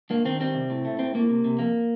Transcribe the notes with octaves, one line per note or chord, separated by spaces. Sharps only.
G2 A#3
D#3 C4
G3 C4
C3
A2
A3
A2 C4
A2 A#3
C3
C3
F2 A#3